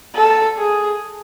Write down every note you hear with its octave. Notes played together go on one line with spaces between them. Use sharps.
A4
G#4